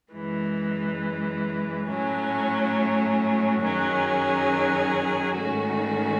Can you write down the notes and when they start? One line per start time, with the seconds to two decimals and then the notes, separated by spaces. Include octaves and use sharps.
0.12 F#2 E3 G#3
1.87 A2 F#3 A3 C#4
3.61 F#2 D#3 F#3 C#4 G#4
5.37 G#2 D#3 A3 C#4 F#4